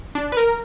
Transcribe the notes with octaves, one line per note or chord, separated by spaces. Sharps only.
D4
B4
A#4